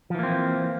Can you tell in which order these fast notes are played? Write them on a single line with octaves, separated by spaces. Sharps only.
F3 E3 A#3 C4